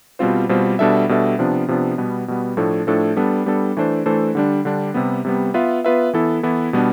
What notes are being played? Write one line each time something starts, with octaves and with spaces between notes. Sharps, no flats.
B2 G3 C4 F4 C5
B2 G3 C4 F4 C5
B2 G3 D4 A4 E5
B2 G3 D4 A4 E5
C3 F3 B3 D4
C3 F3 B3 D4
B2 G3 B3
B2 G3 B3
A2 F3 A3 D4 A4
A2 F3 A3 D4 A4
G3 B3 D4 A4
G3 B3 D4 A4
E3 A3 D4 A4 C5
E3 A3 D4 A4 C5
D3 G3 D4
D3 G3 D4
C3 G3 B3
C3 G3 B3
B3 F4 B4 E5
B3 F4 B4 E5
E3 B3 E4 A4
E3 B3 E4 A4
B2 G3 B3 D4